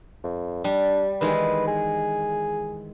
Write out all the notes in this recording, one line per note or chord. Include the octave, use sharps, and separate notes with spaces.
F2
G3 D4
D#3 E3 G#3 B4
G#4